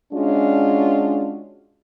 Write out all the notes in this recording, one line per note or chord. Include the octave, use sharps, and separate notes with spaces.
G#3 C#4 D4 F4 F#4